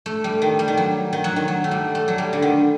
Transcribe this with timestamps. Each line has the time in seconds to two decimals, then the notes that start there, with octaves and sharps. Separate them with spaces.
0.06 A3
0.24 G3
0.42 D#3
0.59 G3
0.68 D#3
0.77 F#3
1.13 D#3
1.24 F#3
1.36 D#3
1.48 F#3
1.64 A3
1.71 G3
1.95 A3
2.08 F#3
2.18 G3
2.33 D3
2.42 D#3